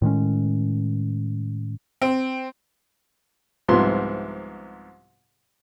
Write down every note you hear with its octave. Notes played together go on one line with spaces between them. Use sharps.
A2 D#3 G#3 C#4
C4
C2 G#2 C3 F3 B3 C6